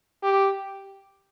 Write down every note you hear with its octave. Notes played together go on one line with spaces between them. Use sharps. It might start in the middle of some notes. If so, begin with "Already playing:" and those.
G4